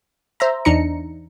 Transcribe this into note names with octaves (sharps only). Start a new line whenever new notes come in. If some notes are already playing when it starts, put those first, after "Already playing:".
C5 E5 A#5
E2 D4 D#4 A#5 C#7